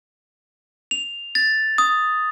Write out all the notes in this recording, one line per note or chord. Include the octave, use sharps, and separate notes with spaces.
F7
A6
D#6